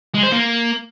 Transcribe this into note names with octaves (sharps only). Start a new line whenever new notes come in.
G#3
C5
A#3